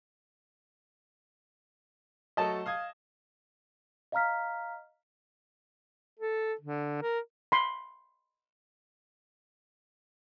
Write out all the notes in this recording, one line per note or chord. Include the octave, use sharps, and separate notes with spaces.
F#3 A3 A4 D#5 A5
F5 D#6 G#6
D#5 F5 A#5 F6 B6
A4
D3
A#4
B5 C6